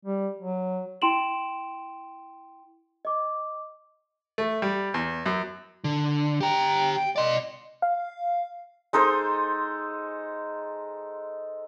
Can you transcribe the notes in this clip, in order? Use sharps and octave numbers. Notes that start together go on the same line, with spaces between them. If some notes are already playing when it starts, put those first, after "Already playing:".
G3
F#3
E4 G5 C6 D7 E7 F#7
D#5 D6
A3
G3
E2
F#2
D3
G4 G5 A#5
G5
D5 D#5 C6
F5
G#3 D#4 A4 C5